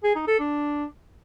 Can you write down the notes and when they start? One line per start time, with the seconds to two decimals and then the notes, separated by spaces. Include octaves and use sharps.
0.04 G#4
0.16 D#4
0.27 A4
0.39 D4